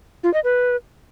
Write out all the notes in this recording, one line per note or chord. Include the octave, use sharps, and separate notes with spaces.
F4
D#5
B4